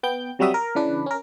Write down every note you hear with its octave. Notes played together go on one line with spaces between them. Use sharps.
B3 G5 G6
C3 F#3 G3 F#4 E5 D#6
A#4
C#3 E3 D4 B4
C#4 A#4